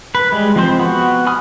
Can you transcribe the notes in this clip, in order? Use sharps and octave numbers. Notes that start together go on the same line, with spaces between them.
B4
G3 G#3
F3 C4 C5
B3 F#4
G#5 B5 D#6 F6